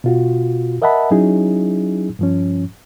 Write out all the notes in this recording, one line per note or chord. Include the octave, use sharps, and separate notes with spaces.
B2 F4 F#4
A#4 D#5 E5 F#5 A5 B5
F#3 C#4 D#4 E4 G#4
G2 F3 C#4